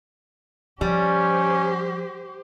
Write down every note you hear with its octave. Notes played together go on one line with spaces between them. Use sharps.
F3 G3 C#4 G4 C5